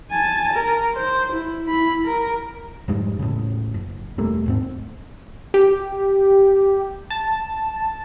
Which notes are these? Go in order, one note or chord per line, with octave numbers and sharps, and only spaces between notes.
G#5 A5
A#4
C5
E4
E4 B5
A#4
F2 G#2 G3 G#3
A2 C#3
F#1
E1 G3 A3 A#3
D#2 G#2 C4
G4
A5